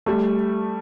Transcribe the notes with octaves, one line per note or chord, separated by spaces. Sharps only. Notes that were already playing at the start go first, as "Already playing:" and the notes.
G3 A3